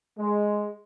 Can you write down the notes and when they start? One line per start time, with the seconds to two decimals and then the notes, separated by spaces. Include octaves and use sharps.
0.18 G#3